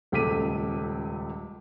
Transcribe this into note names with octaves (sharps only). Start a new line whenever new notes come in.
D#1 C#2 A3 D6 B6 D#7